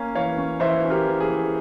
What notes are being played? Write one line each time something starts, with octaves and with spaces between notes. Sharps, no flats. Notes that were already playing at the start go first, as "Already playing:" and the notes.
Already playing: A#3 C#4 F5 G#5
E3 C#5 F5
C#4
E3 C5 E5
C#4
G4 A#4
E3
G#4
E3